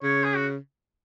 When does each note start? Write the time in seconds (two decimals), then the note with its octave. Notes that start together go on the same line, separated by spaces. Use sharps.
0.03 C#3 C#5
0.24 G#4
0.36 F#4